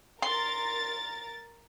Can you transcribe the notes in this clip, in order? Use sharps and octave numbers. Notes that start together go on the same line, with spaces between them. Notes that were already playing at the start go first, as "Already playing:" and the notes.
A#4 C6 A6